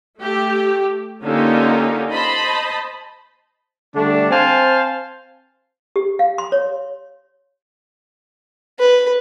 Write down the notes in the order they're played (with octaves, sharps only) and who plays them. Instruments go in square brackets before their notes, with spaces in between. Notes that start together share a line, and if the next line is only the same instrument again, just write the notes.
[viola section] A3 G4
D3 A#3 C#4 D#4 F4 G4
C5 D#5 A5 B5
[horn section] D3 G3 A3 D4
C4 C5 F5 G#5 A5
[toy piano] G4
F5
C6
C#5
[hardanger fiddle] B4